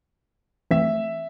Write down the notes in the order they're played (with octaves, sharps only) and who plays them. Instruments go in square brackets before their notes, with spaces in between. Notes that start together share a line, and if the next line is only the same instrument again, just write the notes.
[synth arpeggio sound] E3 A3 C4 [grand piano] E5